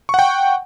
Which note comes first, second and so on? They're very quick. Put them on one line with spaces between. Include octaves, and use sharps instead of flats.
C#6 F#5 G5